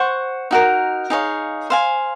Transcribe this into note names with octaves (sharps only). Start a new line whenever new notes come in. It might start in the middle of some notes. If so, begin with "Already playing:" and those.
Already playing: C5 F#5 C#6
D#4 F#4 A#4
D#4 G#4 C#5 F5
C5 F5 G#5